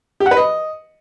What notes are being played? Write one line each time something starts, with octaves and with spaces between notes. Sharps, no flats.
G4
F#5
B4
D#5